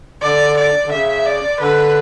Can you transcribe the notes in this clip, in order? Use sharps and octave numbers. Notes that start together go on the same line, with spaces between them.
D3 D5
D5
D3
C#3 E5
D5
D3 B4